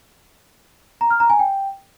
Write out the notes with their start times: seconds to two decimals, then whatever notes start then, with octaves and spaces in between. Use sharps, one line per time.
1.01 A#5
1.10 F6
1.20 A#5
1.30 G#5
1.39 G5